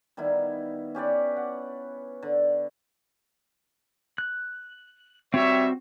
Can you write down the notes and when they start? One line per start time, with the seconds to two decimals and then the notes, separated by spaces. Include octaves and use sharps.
0.17 D#3 G3 B3 E4
0.95 C#4 G4 B4 D5
1.37 F#5
2.23 D3
4.18 F#6
5.34 G3 C4 F#4 C#5 E5